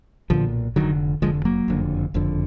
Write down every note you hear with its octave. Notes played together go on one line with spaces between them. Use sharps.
B1 A#2 D3 F3
F1 D#2 D3 D#3 F#3
F1 D#2 D3 F3 G#3
F#3 A#3
F#1 F2 D3
F#1 F2 D3